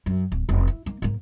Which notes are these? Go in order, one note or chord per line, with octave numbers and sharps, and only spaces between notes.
F#2
D1
F1
E4
A#3 D#4
G#2 A#3